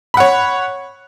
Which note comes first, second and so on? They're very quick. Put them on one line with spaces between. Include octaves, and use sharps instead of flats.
B5 F#5 C#5